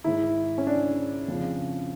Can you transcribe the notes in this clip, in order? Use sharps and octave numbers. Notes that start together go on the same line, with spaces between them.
G#2 D#3 E4
C#4
D4
F2 C#3 F3